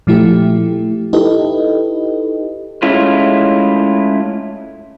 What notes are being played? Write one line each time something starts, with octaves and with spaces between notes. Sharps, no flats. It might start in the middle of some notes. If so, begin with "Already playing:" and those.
A#2 F3 A3 E4 G4
D#4 E4 G4 A4 B4 D#5
G#3 A3 C#4 E4 F4